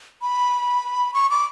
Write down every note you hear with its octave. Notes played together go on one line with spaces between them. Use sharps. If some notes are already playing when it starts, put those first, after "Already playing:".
B5
C#6
D6